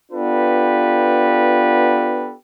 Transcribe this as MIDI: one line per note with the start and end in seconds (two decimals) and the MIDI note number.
0.12 2.33 59
0.12 2.33 62
0.12 2.33 65
0.12 2.33 67
0.12 2.33 69
0.12 2.33 71